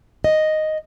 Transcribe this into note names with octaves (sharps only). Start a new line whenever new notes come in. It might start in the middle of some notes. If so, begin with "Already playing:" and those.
D#5